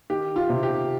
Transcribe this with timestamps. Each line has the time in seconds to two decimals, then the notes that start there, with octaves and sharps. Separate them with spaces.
0.10 D#3 G4
0.36 F4
0.49 C3
0.63 G4